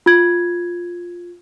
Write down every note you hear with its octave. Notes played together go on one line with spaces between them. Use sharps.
F4 G#6